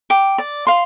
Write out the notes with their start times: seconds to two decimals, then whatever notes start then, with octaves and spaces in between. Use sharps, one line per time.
0.10 G5 D6
0.38 D5
0.67 F5 C6